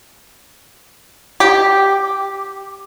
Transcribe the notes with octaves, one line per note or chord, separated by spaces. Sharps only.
G4